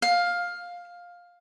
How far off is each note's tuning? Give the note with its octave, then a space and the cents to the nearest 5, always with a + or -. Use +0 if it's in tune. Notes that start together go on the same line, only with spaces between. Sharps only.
F5 +10